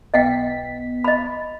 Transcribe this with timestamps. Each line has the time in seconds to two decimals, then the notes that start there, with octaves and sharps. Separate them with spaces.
0.14 B1 B3 D#5 F#5 G5 B6
1.04 D#5 B5